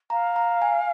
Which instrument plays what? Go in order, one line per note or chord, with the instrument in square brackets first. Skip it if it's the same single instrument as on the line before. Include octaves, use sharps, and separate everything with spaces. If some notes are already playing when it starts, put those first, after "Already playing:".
[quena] F5 [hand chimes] A#5
[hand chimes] A#5
G#5